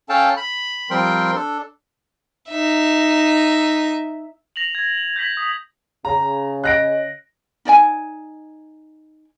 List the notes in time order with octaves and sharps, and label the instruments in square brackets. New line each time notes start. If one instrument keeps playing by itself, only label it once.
[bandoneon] C#4 A4 F5 G5 A5
B5
F3 G3 C4 A#4 G5 C6
D4 A4
[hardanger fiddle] D#4 E5
[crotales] A#6 F7 F#7
G#6
F#7
G6 G#6 B6 F#7
D#6
[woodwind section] C#3 [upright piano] A#5
[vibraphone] D#5 [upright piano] F#6 A#6 D7
[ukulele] D#4 D5 D#5 G#5